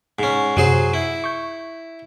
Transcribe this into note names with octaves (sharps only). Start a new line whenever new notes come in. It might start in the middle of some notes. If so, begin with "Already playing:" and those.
G#2 C#4
F#2 C3 F#3 G#4 C5
E4
C#6 G6